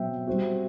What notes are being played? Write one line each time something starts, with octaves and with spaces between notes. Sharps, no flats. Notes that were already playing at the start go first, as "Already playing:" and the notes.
Already playing: B2 F#3 C4 E5 G5
G3 C4 F#4